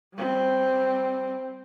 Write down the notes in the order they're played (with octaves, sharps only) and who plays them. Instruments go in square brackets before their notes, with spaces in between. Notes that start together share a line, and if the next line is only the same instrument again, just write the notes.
[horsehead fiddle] G3 C4